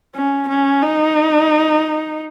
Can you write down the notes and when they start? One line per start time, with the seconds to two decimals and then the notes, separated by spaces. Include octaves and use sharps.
0.15 C#4
0.49 C#4
0.82 D#4